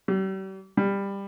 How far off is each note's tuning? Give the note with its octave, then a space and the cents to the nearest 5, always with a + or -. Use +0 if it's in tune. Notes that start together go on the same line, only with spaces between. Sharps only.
G3 -40
G3 +15